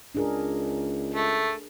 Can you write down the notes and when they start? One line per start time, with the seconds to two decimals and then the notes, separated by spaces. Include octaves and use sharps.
0.15 C#2 D4 G#4 A#4
1.14 A3